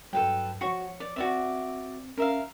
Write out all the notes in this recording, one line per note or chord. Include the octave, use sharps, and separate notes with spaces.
G2 F#3 A4 B4 G5
F3 F#4 C#5 C#6 C#7
D5
C4 F#4 D5 E5
C#4 A#4 E5 F5